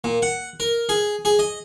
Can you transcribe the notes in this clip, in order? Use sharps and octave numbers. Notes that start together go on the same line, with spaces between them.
A#2
F#5
A#4
G#4
G#4
D#5